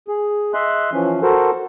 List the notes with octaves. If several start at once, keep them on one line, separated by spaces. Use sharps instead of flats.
G#4
D#5 E5 C6 F#6
E3 F3 C#4
F#4 A4 A#4 C5